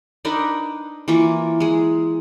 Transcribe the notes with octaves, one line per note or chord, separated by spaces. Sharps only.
D4 D#4 A#4 B4
E3 A#3 F4 C#6
G#3 G#4